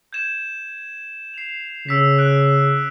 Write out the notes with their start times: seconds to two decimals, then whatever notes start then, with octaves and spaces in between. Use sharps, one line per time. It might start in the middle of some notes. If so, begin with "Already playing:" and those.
0.13 G6 G#6 E7
1.34 C7 F7
1.87 C#3 E6 B6 F7
2.18 F#6 D7